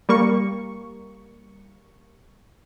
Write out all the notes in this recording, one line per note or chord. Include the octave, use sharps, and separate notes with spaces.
G3 A#3 C#6